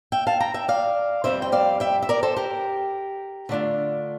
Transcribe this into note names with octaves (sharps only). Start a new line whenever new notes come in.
E5 G5
F5 A5
G5 A#5
E5 G5
D5 F5
F2 E3 G3 C4 C5 E5
G5
D5 F5
E5 G5
E5
A#4 D5
A4 C5
G4 A#4
D3 A3 D4 F4